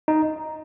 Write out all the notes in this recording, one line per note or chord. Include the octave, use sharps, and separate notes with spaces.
D#4